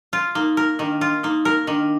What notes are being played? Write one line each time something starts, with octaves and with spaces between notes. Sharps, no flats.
F4
A#3 D#4
A#4
D#3 D4
F4
A#3 D#4
A#4
D#3 D4